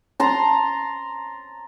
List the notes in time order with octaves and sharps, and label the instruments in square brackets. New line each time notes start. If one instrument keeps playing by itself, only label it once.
[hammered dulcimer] A5 A#5 C6